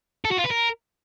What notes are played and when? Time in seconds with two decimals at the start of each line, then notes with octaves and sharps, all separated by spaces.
0.25 A4
0.31 F#4
0.38 F4
0.44 B4
0.51 A#4